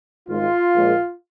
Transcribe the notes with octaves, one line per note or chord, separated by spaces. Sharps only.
G#1 G#2 G#3 F4
A#1 A#2 G#3